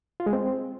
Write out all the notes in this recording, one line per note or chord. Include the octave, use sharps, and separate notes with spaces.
F4
G#3
C4